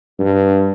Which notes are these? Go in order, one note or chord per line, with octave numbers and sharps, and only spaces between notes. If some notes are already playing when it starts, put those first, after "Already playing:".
G2